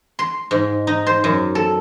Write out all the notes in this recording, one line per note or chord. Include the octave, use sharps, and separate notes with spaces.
C6
G#2
D#4
C5
F#2
A4